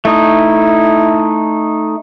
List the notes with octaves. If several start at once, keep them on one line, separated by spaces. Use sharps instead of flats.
A3 D#4 E4